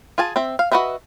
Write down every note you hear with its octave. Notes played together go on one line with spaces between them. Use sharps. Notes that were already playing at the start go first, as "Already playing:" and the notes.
F4 G#4 G#5 A5
C4 E5
F5
F#4 A#4 B4 D#5 E5